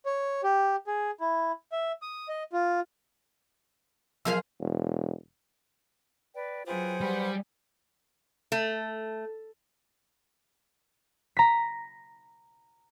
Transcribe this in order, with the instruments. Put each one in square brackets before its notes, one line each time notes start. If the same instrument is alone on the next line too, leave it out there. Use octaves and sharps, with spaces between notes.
[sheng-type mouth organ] C#5
G4
G#4
E4
E5
D#6
D#5
F4
[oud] F3 G#4 F5 [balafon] F#3 A#4 C6
[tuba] E1
[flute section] B4 D5 G5
[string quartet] F#3 G#4 [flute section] F4 B4 G5 [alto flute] C5
[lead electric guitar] G3 [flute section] B4 F#5 B5
[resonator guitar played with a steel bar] A3
[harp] A#5 B6